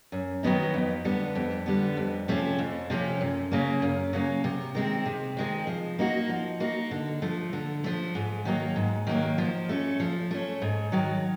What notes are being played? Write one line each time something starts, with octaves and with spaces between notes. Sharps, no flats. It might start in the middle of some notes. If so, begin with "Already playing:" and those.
F#2
D#3 F#3 B3 D#4
F2
D3 G3 B3
F2
D3 G3 B3
F2
C3 F3 A3 C#4
F2
C3 F3 A3 C#4
F#2
C#3 F#3 A#3
F#2
C#3 F#3 A#3
C3
D#3 G#3 C4
C3
D#3 G#3 C4
F3
A#3 D#4 F#4
F3
A#3 D#4 F#4
D3
F3 A3
D3
F3 A3
G#2
D#3 F#3 A#3
G#2
D#3 F#3 A#3
F3
A3 C#4
F3
A3 C#4
G#2
D#3 F#3